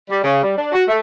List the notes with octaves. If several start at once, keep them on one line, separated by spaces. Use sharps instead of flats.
G3
C#3
G3
D4
F#4
A3